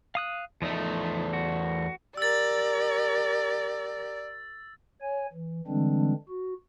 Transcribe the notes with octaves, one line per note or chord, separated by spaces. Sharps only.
F5 D#6 F#6
E2 F3 A3 D#4
F#4
G4 A#4 D5 E6 A6
C#5 G#5
E3
D3 E3 G3 G#3 C4 D4
F#4